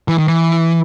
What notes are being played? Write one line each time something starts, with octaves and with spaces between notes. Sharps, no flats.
E3
D#3
E3